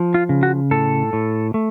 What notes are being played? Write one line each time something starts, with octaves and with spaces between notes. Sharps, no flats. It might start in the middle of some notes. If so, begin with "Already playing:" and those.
Already playing: F3
F4
C#3
F#4
A2 A4
A2
A3